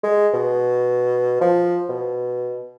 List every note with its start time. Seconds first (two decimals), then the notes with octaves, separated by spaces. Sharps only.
0.03 G#3
0.33 B2
1.41 F3
1.89 B2